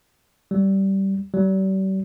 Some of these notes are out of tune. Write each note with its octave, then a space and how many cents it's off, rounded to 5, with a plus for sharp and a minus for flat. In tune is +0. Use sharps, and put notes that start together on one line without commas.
G3 -15
G3 -40